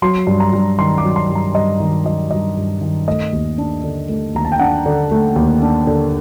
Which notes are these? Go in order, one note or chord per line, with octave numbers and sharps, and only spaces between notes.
F#3 C6
G2
A#5
G2
D#3 C6
D6
F#3
C6
G2
A#5
G2 D#5
D#3
F#3 D#5
G2 D#5
G2
D#3
A3 D#5
D#2
D4
D3
A3
D#2 A#5
A5
G5
D4 F#5
D3
A3
D#2
D4
D3